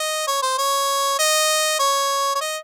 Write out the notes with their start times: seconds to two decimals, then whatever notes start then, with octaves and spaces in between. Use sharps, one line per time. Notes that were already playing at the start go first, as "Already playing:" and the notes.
Already playing: D#5
0.27 C#5
0.42 C5
0.58 C#5
1.19 D#5
1.80 C#5
2.35 C#5
2.41 D#5